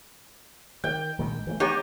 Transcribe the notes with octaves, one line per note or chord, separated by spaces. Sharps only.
D#3 G5
A#1 D#3 G#3
E3 G3 A3
B3 D#4 G4 C#5